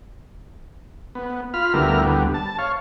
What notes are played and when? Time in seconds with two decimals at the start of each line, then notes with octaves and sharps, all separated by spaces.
1.15 B3
1.54 F4 B5 F6
1.74 D2 G3 B3 E4 A#4 F6
2.02 D2 G3 B3
2.34 A5
2.58 C#5 F5